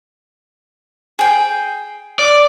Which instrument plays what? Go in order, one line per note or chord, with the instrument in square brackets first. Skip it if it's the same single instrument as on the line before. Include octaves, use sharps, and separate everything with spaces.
[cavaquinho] G#4 G5
[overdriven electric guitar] D5